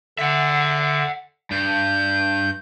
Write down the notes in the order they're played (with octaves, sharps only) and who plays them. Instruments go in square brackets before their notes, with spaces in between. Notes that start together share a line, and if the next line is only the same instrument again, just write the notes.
[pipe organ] D3 [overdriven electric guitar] E5 F#5
[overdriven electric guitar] G2 [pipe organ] G6